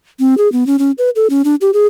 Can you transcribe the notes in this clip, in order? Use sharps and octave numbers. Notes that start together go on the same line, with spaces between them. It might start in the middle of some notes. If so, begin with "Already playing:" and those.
C4
G#4
B3
C#4
C#4
B4
A4
C#4
D4
G4
G#4